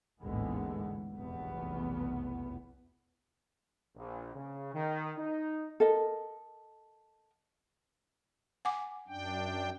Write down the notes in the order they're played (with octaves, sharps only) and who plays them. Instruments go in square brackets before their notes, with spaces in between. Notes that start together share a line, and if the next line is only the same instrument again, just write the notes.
[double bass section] A1 D#2 G#2 D3 G#3 B3
F1 B1 E2 B3
[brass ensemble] A#1
C#3
D#3
D#4
[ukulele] A4 A#4 D#5
[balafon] F#5 G#5 D6
[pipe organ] F#2 D4 G5